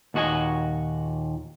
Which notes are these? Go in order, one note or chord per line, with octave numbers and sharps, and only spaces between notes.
D#2 A#2 F#4 D#5 G#5